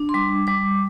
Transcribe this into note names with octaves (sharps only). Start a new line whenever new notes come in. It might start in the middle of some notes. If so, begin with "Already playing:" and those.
Already playing: D4
C6
G3 D6
G3 D6